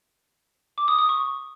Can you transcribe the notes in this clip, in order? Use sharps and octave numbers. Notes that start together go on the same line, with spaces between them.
D6
D#6
D#6
C#6